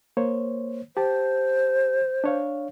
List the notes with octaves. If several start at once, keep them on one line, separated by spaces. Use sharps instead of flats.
A#3 C5 C#5
G4 C5 A5
D4 C#5 F5